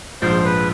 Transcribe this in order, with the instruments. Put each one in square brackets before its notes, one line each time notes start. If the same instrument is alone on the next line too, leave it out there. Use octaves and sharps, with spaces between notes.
[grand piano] A#1 G#2 F3 [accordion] C5
[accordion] B4